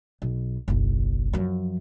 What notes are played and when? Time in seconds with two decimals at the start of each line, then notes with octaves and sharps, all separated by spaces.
0.22 B1
0.68 F#1 B1
1.33 F#2 F3